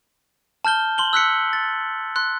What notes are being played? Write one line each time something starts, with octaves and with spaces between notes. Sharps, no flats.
A5 F6 G6 G7
C6 F#7 G7
E6 F#6 B6 C#7
A6
C6 F#6